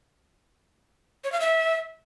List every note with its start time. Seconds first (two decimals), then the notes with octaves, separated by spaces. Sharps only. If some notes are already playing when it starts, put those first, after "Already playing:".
1.24 C#5
1.32 F5
1.40 E5